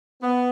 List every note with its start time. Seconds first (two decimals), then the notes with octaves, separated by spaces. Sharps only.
0.21 B3